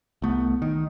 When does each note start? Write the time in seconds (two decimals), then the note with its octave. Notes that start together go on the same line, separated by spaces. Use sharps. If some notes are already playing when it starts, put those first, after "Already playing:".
0.22 C2 A3 B3
0.62 D#3